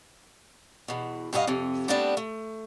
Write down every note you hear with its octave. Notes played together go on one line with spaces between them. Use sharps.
E2 B2
G2 E4 F#4 G#4 D#5 F5
F2 C3
G3 A3 B3 C4 D4
A3